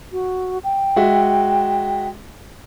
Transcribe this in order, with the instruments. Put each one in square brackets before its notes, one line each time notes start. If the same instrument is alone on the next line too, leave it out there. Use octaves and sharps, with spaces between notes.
[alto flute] F#4
G5
[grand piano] G#3 F#4 E5